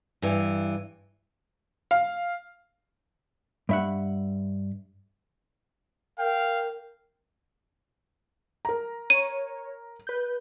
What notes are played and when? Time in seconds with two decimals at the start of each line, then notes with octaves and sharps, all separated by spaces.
0.22 G2 E3
1.91 F5
3.69 G2 E5 F#5
6.19 A#4 F5 G5
8.65 A#4 A#5
9.10 C#5 D#7
10.07 B4 G6